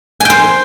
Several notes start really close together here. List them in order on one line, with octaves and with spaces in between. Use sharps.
G#5 G5 C5